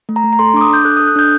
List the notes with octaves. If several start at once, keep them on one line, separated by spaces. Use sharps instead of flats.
A3
A#5
A3
A#5
A4 C6
D4 D6
D#6
D4 G6
A4 F#6
D#6
A4
F#6
D4 G6